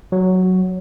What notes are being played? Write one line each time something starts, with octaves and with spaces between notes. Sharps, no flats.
F#3